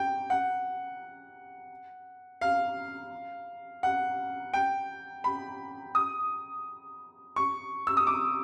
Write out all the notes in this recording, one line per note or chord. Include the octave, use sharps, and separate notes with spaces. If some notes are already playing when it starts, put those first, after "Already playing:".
Already playing: G5
F#5
F5
F#5
G5
B5
D#6
C#6
E6
D#6
D6